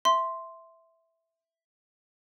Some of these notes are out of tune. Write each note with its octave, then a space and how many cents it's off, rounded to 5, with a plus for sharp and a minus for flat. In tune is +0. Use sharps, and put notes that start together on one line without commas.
E5 +0 C6 +0